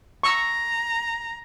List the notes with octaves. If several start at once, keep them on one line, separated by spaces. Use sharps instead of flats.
A#5 C#6 E6